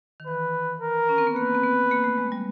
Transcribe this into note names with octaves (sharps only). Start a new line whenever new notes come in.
D#3
E3 B4
A#4
C#4
C4
B3
A#3 B4
C4
B3
A#3
A3
G#3
G3